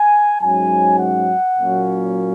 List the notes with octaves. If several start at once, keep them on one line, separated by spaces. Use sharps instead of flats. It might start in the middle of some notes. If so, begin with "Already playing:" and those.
Already playing: G#5
G#2 F#3 C#4 G#5
F#5
A#2 F#3 A#3 C#4